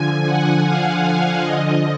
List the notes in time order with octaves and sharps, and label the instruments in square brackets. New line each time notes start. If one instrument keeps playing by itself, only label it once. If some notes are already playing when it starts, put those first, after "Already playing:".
Already playing: [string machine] D3 F3 G#5
F#5
F5
D3 F3 D#5